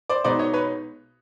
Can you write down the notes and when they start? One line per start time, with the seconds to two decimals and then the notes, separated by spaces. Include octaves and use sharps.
0.09 C5 D5
0.24 B1 B2 G#3 B3 D#4 C5 D5
0.39 C#5 D#5
0.53 B4 C#5